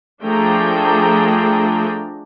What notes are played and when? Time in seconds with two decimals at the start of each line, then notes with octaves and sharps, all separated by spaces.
0.23 F3 A3 D4 G#4 G5 A#5